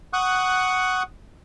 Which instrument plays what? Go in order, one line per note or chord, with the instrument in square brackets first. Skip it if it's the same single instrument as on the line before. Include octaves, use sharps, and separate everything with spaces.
[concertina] F#5 C#6 D#6 F#6